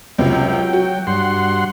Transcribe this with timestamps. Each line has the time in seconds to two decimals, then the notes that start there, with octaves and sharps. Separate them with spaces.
0.18 C#2 C3 F#3 G5
0.73 F#4
1.07 G2 F#5 C6